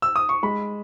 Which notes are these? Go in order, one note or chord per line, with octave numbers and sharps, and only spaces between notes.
E6
D#6
C#6
G#3 B5